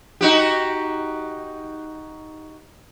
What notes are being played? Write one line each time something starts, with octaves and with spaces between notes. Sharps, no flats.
D#4 F#4 G4